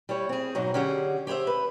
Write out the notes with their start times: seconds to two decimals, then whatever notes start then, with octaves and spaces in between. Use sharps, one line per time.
0.09 G3 E4 C#5
0.29 C4 G#4
0.55 G#2 B2 F#3 D#4
0.74 D3 C#4 G4 G#4 F#5
1.27 G4 G#4 B4 C5 E5
1.47 B4